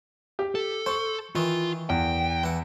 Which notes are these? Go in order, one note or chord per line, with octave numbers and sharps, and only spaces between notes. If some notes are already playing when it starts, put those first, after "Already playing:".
G4
A4
C5 C#6
D#3 E3 F4
E2 G5
E3 F#5